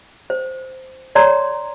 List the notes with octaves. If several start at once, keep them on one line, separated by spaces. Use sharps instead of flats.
C5
C#5 D5 A#5 C6